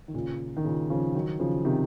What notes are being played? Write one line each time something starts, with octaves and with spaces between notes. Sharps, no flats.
D#3
A#2 C#3
D#3
A#2 C#3
C#3 F3
D#3 F#3
C#3 F3
C3 D#3